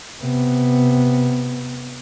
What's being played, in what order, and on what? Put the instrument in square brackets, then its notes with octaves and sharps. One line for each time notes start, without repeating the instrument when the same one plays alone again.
[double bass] C3 B3